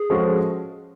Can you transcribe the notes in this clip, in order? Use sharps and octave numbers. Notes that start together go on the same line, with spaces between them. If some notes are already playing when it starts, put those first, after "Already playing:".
Already playing: G#4
F3 G#3 C#4 F#4 A4